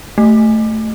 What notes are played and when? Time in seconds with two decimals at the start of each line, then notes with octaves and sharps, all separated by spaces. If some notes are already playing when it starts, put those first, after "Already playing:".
0.18 A3